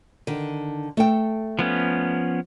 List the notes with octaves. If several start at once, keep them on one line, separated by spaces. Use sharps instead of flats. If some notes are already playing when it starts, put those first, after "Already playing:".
D3 D#3
A3 A4 G5
F3 B3 C#4